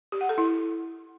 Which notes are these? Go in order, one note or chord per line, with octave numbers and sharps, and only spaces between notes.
G4
F#5
A4
E4